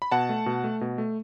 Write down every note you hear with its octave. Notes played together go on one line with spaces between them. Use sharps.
B5
B2 F#5 A5
A3
B2
A3
B2
A3